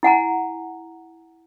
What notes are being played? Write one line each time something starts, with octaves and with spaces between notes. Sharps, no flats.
E4 F#5 G#5 A#5